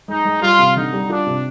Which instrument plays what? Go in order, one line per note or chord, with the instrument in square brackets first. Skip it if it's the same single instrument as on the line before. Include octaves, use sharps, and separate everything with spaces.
[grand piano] G#3 [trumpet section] D#4
[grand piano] G#3
[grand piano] G3 [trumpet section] F4
[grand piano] C3
[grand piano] D3 [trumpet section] D#4
[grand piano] G3
[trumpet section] D4 [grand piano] F4
[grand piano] C3